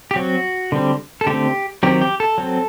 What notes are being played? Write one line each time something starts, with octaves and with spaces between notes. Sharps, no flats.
G4
F#3 C4 F#4
D3 G3 C4
A4
D3 A3 C4 G4
D#3 F#3 C4 G4
G4
A4
F#3 C4